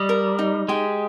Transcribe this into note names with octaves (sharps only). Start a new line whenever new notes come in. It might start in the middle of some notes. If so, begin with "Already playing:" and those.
Already playing: G3 D#5
A#4
D#4
G#3 G4